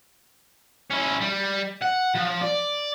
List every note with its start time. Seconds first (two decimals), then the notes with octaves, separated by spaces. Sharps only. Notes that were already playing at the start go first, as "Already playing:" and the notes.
0.90 C#4 E4
1.21 G3
1.82 F#5
2.15 F3
2.41 D5